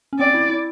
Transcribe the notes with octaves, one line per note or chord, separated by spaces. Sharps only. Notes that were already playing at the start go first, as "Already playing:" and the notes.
C#4
C4 D5
E4
E4